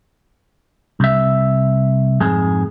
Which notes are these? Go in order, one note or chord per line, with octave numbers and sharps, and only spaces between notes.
C2 E5
F2 G#2 G#4